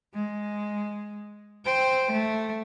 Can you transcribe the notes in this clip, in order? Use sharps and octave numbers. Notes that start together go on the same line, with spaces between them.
G#3
C5 G5
A3